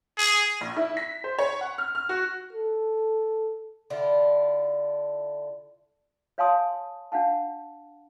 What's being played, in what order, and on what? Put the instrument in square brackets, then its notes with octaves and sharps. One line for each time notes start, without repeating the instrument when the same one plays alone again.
[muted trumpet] G#4
[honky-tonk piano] A#1
E4
B6
C5
C#5
F#5
F6
F6
F#4
[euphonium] A4
[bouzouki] D3 E4 F4
[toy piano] C#5 F5 G#5 A5 C6 D#6
D4 F5 F#5 A5